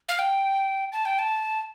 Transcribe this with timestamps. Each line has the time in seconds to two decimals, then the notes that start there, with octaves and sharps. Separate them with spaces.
0.09 F5
0.19 G5
0.92 A5
1.05 G5
1.19 A5